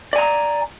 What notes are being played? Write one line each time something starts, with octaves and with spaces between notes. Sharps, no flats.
D5 G#5 A#5